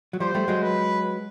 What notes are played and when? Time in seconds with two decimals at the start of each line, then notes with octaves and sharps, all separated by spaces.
0.13 F#3
0.20 F3 G3 C5
0.35 G3 A3
0.48 F#3 G#3
0.62 B4